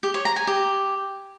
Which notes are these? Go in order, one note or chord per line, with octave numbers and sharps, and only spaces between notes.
G4
C#5
A#5
G#5
G4